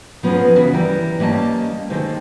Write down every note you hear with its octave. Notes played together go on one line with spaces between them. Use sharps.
F3 B3 C#4 G#4 A#4
C#3 E3 F#4 B4
E3 G3 A#4
G3 A#3 C#4 D#5 A5
C3 D#3 G#3 A4